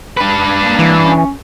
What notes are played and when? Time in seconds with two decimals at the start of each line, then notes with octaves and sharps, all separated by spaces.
0.17 D4 B4
0.59 A#3
0.79 E3
1.03 C#4